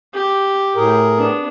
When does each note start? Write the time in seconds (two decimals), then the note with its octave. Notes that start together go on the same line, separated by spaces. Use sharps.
0.14 G4
0.76 A2 G#4 A#4
1.17 B3 D4